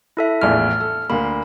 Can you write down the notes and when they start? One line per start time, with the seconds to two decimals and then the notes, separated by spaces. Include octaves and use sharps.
0.17 E4 A4 E5
0.41 A#1 E2 A2 F6
0.80 A4
1.10 D2 A#3 B5